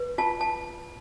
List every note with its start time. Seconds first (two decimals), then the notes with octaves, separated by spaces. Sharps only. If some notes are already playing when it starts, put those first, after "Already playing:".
Already playing: B4
0.18 F4 A5
0.41 A5